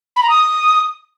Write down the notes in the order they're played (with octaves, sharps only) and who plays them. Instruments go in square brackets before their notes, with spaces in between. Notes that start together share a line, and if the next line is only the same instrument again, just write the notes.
[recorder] B5
A#5
D#6